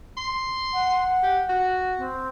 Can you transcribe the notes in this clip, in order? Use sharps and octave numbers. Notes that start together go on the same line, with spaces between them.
C6
F#5
G4
F#4
C4